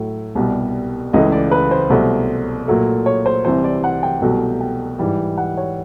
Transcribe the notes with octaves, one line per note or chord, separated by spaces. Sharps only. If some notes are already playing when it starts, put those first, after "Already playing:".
Already playing: A2 F#3 A3
C2 B2 G3
C#2 C#3 E3 A3 D#5
D5
B4
C5
C2 B2 F#3 A3
A#2 F#3 A3
C#5
C5
C2 C3 E3 C5
D5
F#5
G5
C2 B2 F#3 A3
G5
G#2 E3 G3
F#5
C#5